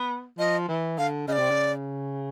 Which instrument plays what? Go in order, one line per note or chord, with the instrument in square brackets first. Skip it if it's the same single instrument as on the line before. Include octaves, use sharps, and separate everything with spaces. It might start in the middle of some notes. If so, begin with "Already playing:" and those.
Already playing: [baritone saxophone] B3
[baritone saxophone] F3 [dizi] D#5
[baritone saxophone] E3
[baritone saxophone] D3 [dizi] F5
[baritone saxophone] C#3 [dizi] D#5
[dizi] D5
[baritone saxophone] C3
C#3